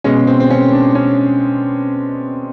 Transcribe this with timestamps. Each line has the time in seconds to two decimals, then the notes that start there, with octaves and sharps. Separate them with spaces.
0.04 B2 G#3 C#4
0.27 C4
0.40 C4
0.50 C#4
0.72 D4
0.95 C#4